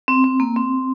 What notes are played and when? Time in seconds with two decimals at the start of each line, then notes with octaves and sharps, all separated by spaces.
0.08 C4
0.24 C4
0.40 A#3
0.56 C4